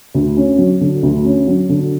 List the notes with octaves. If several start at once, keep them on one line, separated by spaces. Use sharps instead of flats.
D2
C#4
F#3
D3
D2
C#4
F#3
D3